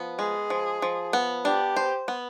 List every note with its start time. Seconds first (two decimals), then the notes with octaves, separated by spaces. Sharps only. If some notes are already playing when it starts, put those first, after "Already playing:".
Already playing: F3 B3
0.19 G#3 G#4
0.50 F3
0.82 F3
1.13 B3
1.45 D4 G4
1.77 C5
2.08 B3